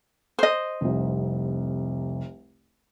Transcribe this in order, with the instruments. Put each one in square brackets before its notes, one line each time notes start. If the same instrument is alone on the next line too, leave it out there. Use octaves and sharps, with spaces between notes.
[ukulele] C5 D#5
[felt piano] F1 C2